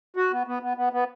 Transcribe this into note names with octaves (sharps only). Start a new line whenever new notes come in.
F#4
B3
B3
B3
B3
B3